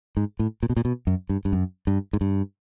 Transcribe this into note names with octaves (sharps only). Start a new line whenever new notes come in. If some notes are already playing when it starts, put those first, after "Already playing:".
G#2
A2
A#2
B2
A#2
B2
F#2
G2
G2
F#2
G2
G#2
G2